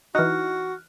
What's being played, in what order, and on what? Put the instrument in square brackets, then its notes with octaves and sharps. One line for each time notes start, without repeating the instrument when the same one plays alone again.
[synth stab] E3 D#4 [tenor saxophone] F#4 [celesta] F6 F#6